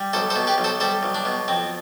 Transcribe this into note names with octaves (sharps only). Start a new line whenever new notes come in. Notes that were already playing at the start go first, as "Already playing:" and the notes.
Already playing: G3
B1 A4 C5
A4 C5
B2
G4 B4
B1
A4 C5
G3 A4 C5
B1
D4
B2
F2 C4